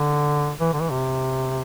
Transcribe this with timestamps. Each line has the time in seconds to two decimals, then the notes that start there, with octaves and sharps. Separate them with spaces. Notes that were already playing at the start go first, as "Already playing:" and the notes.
Already playing: D3
0.60 E3
0.73 D3
0.81 E3
0.91 C3